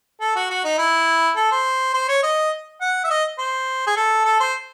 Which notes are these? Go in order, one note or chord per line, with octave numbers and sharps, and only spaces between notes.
A4
F#4
F#4
D#4
E4
A4
C5
C5
C#5
D#5
F#5
E5
D#5
C5
G#4
A4
A4
C5